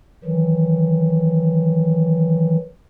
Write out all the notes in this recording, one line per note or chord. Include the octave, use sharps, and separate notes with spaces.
D#3 E3 F#3